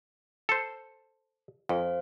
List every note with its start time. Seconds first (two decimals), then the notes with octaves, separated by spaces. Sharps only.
0.49 A4 C5
1.69 F2 C5 F5